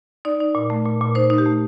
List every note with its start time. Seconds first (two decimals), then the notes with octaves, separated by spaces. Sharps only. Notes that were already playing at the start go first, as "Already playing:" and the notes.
0.25 D#4 D5
0.40 D#4
0.55 A#2
0.70 A3
0.85 A#2
1.01 A#2
1.15 D#4 C5
1.30 D#4
1.38 G4
1.46 A3